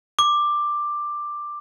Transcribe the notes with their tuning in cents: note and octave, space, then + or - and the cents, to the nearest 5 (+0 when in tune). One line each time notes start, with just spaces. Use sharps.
D6 +10